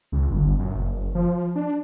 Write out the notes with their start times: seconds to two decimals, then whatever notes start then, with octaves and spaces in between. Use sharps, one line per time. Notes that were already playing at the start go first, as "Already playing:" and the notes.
0.12 C#2
0.30 G1
0.59 F#2
0.74 F#1
1.15 F3
1.55 D4